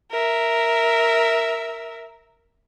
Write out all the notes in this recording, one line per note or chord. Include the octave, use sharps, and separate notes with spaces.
A#4 E5